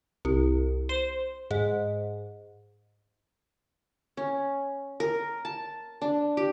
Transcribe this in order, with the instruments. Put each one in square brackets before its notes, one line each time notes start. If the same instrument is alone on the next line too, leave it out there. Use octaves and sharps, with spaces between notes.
[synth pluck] C2
C5
G#2
[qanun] C#4
A#4
A5
D4
G4